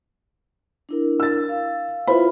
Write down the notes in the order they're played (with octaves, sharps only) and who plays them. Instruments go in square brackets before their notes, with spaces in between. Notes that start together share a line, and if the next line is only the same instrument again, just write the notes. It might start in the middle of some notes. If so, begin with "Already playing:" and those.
[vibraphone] D4 E4 A#4
[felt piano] E6 A6
[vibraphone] F5
[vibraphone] E4 F4 E5 [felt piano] B4 C5 B5